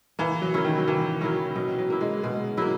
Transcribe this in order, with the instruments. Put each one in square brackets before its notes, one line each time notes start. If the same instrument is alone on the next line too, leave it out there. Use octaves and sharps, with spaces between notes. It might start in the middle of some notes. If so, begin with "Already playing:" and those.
[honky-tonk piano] E3 [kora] A#3
[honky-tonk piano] F#3
[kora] C#4 E4 A#4
[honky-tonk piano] D#3
F#3
[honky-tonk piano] E3 [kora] A#3
[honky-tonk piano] F#3 [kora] C#4 E4 A#4
[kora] B2 [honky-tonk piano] F#3
[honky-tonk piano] F#3
[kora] A#3 E4
[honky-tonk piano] G#3
[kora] B2 [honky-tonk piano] G#3
[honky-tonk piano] F#3 [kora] A#3 E4